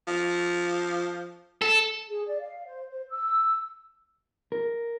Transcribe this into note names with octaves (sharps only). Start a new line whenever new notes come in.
F3
A4
G#4
D5
F5
C5
C5
E6
A#4